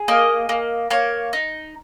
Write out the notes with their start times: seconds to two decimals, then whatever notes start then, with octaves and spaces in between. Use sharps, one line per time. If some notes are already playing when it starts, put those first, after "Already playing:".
Already playing: G#4
0.08 A#3 D#5
0.49 A#3
0.90 A#3 C#5
1.33 D#4